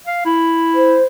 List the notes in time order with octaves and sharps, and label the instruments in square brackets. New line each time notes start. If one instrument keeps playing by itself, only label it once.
[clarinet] F5
E4
[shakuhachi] C5